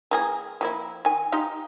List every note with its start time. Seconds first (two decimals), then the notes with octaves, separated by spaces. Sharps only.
0.11 E3 A#3 G#4
0.61 F3 A#3 E4
1.05 D#3 G#5
1.32 D#4 F4 G4